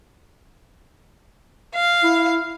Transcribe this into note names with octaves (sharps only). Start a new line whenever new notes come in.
F5
E4